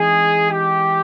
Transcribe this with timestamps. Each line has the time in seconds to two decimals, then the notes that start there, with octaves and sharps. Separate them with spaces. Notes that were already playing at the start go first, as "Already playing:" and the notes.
Already playing: E3 G#3 C4 D#4 G#4
0.51 G4